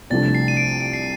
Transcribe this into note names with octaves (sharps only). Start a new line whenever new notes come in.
C2 C3 F3 A3 D4 A6
C7
D#7
D7
D7
C7